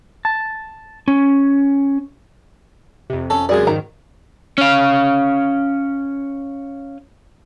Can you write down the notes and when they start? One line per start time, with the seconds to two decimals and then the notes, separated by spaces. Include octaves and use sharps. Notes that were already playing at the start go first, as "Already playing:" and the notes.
0.25 A5
1.08 C#4
3.10 F2 C3
3.30 C#4 A4
3.49 F#2 C#3 G#3 G#4 D5
3.67 G#2 D#3 A#5
4.58 C#4 F5